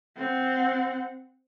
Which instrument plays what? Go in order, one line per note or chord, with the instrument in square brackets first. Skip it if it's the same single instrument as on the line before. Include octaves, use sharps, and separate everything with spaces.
[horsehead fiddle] C4 F#5